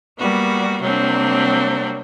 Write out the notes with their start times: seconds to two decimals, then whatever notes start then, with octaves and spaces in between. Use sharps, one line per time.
0.18 G3 A#3 B3 F#4
0.81 C3 F#3 G3 A#3 C4 D4